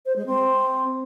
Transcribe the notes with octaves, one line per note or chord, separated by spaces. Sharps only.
C5
G#3
C4